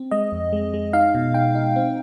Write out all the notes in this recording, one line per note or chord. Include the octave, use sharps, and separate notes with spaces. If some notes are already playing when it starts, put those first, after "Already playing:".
Already playing: C4
G#3 D#5
F2
G#3
G#3
D#4 F5
B2
D#4 G5
D#4
C4